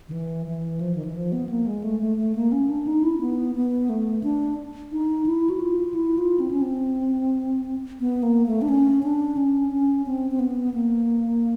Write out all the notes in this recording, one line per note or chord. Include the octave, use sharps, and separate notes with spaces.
D#3
E3
E3
F3
D#3
E3
F3
B3
A#3
G#3
A3
A3
A3
A#3
C#4
D4
D#4
E4
B3
B3
A3
D4
D#4
E4
F#4
F4
E4
F4
C4
C#4
C4
B3
A#3
A3
D4
C#4
D4
C#4
C#4
C4
C4
B3
A#3